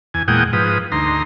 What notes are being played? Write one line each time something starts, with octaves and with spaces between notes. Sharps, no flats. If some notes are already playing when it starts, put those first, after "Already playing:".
E2 G#5
E2 A#2 G#3 F#5 G5 D#6
G#2 F3 B4 D#6
D2 D#4 A#5 C6